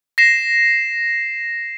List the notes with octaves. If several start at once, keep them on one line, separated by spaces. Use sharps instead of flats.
A#6 C7 E7